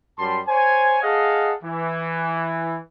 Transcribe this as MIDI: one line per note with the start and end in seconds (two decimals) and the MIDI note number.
0.19 0.39 42
0.19 0.39 55
0.19 0.39 81
0.19 0.39 84
0.48 0.98 72
0.48 0.98 73
0.48 0.98 80
1.03 1.53 68
1.03 1.53 69
1.03 1.53 75
1.03 1.53 77
1.03 1.53 78
1.64 2.78 52